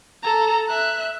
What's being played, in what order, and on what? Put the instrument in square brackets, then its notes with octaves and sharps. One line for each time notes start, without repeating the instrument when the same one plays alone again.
[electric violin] A4 A#5
E5 F#6